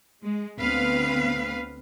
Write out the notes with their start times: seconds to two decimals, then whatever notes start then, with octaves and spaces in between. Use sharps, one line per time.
0.24 G#3
0.59 D2 B3 C4 B4 F5